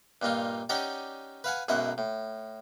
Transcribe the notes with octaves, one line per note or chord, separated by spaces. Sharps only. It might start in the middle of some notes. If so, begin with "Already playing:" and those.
G2 A#2 D#4 F4
C#4 D#4 G4 D5 F#5
B4 F5 F#5 G#5
B1 F#2 G#3 E4 F#5
A2